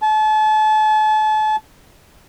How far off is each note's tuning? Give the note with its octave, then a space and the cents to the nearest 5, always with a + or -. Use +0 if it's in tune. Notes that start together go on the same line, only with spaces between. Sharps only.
A5 -35